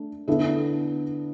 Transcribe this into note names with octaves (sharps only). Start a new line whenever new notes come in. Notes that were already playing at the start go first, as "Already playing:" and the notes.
Already playing: A3 D4
D3 B3 E4 A4 E5